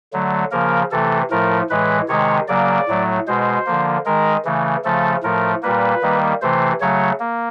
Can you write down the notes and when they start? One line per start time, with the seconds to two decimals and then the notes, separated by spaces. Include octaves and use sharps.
0.13 D3 F#3 A3
0.51 C#3 F3 A#3 A#4
0.91 C3 E3 A3 A4
1.30 A2 F3 A3 A#4
1.70 A2 E3 G#3 B4
2.09 C3 D#3 G#3 C#5
2.48 C#3 F#3 A#3 D5
2.88 A2 F#3 A3
3.27 B2 G#3 C5
3.66 D3 F3 A#3
4.06 D#3 G#3 A#4
4.45 C#3 E3 A3
4.85 C#3 F3 A3 A4
5.23 A2 F3 A3 A#4
5.62 A#2 G3 A#3 B4
6.02 D#3 G3 A#3
6.42 C3 E3 A3 C5
6.81 C#3 F#3 A3 C#5
7.20 A#3